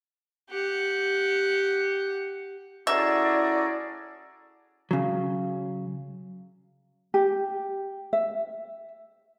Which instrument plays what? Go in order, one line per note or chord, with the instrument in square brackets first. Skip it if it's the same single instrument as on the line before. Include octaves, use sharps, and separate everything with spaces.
[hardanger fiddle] G4 F#5
[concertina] C#4 A4 A#5 [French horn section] E4 [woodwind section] F#4 G#4 D5 [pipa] E5
[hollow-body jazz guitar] C#3 F#3
[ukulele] G4
E5